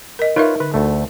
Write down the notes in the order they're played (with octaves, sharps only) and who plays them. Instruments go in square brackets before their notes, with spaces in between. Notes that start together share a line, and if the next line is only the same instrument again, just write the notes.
[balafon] A#4 D#5
[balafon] D#4 A#4 E5 [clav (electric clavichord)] F4 B4 C#5
[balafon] D3 [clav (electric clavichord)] B4
[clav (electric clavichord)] D2 A3